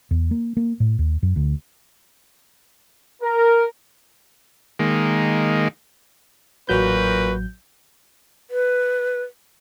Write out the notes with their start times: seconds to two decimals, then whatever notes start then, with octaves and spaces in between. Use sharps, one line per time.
0.11 E2
0.31 A#3
0.57 A#3
0.80 A2
0.99 D#2
1.23 F#2
1.36 D2
3.23 A#4
4.79 D#3 G#3 A#3
6.69 A1 A#2 F#3 F#4 B4 G6
8.49 B4